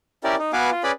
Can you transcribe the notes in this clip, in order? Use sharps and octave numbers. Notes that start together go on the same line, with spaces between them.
C#4 E4 G4 A#4 D5
D#4
B3 F#4 B4 F5 G#5 D6
F4
C#4 G#4 B4 D5 B5